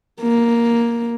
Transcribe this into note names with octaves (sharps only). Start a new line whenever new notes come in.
A#3